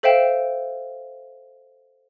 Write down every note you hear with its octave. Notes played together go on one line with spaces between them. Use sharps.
A4 C5 E5 F5 G5 E7